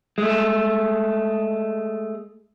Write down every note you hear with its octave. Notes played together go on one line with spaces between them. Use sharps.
G#3 A3